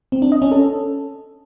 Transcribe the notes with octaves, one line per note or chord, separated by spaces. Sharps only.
C4
D4
D#5
C#4
A4